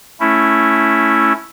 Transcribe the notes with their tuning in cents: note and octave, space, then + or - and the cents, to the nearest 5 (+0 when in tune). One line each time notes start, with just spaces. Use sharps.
A3 +0 C#4 +0 E4 +0